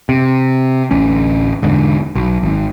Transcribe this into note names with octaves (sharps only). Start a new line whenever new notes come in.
C3
D1 A1 C#4
E1 G#2 D3
B1
G#1